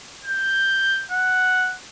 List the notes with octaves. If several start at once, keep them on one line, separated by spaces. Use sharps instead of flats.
G6
F#5